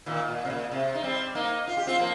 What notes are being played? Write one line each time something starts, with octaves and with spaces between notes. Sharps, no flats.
A#2 D#3
A#2
C3
A#2
C3
D#4
G3 C4
A#3 D#4
F4
G4
C4 F4
F3 A#3